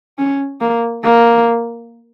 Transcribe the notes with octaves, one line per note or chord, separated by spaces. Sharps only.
C#4
A#3
A#3